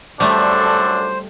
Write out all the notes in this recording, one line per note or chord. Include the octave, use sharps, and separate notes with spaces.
F#2 G3 A3 D4 A4 C5